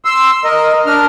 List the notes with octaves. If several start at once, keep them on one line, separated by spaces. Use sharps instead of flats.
C6 E6
A#4 D#5
D4 A#4 F6